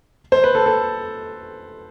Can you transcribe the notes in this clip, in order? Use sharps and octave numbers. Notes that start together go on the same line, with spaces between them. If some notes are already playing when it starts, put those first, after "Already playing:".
C5
B4
A4
A4